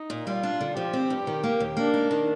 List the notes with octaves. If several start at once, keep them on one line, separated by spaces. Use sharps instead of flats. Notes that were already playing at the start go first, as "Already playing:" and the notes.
Already playing: D#4
A#2
G3 F4
D4
D3
F3 G4
C4
G2
D#3
A#3
D#2
A#3 D4
D#4
D#3